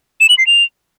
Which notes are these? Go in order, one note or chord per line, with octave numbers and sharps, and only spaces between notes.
E7
F#7
C7
F7